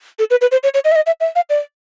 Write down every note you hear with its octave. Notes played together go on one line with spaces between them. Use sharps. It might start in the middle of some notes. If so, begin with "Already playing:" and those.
A4
B4
B4
C5
C#5
C#5
D#5
E5
D#5
E5
E5
F5
D5